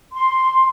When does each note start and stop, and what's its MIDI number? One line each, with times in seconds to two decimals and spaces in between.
0.13 0.67 84